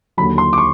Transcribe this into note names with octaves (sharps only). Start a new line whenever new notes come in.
D#2 D3 F#3 B5
C6
D6
C#6